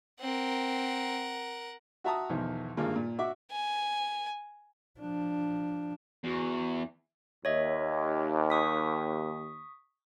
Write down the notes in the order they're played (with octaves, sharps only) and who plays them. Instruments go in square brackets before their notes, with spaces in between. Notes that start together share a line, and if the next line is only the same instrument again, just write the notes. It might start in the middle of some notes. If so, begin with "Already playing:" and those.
[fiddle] C4 [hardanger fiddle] A#4 F#5
[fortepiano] F#4 E5 A5 A#5 D#6
B1 E2 D#3 F3
G#1 G2 G#3 A#3 F4
A#2
F#4 E5 D6
[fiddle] G#5
[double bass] F3 D4
[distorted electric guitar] E2 [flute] F#4
[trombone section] D#2 [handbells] C#5 D#5 E5
[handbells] C#6 D#6 B6